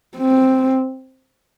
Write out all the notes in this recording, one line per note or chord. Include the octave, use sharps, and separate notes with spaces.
C4